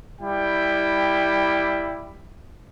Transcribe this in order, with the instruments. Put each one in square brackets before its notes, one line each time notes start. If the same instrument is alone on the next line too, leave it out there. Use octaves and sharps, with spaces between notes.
[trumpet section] G3 E4 G5